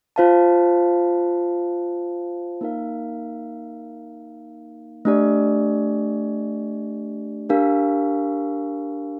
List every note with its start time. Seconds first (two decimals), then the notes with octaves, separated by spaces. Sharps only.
0.16 F4 C5 F5 A5
2.61 A#3 D#4 A#4 F5
5.05 A3 D4 G4 D5
7.49 D4 G4 A#4 F5